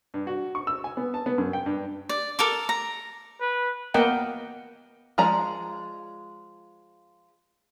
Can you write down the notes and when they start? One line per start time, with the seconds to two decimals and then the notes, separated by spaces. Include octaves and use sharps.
0.14 G2
0.27 F#4
0.55 C#6
0.67 E6
0.84 G#5
0.97 B3
1.14 A5
1.26 B3
1.38 F#2
1.53 G5
1.66 G2
2.09 D5
2.39 A4 A#4 D6
2.69 A#5
3.41 B4
3.94 A#3 B3 A#4 D#5 F#5 G5
5.18 F3 G#3 D5 A#5